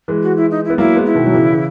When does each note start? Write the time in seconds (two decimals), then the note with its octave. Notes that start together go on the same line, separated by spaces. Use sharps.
0.08 E3 G#3
0.22 F#4
0.36 E4
0.50 D#4
0.64 E4
0.70 B3
0.78 F#3 A#3 E4
0.96 G#3 B3
1.06 E4
1.15 B2 D#3
1.26 F#3
1.34 C#3 E3
1.53 C#3